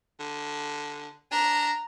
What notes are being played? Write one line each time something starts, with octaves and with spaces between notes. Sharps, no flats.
D3
D4 A#5